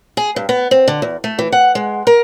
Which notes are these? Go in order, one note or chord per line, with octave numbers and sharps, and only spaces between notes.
G#4
G2
B3
C4
D3
E2
A3
E3
F#5
G#3
A#4